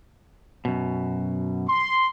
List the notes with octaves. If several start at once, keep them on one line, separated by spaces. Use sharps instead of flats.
F#2 B2
C6